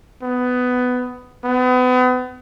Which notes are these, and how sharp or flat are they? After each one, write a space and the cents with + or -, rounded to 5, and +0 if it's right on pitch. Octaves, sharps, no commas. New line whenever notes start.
B3 +15
B3 +35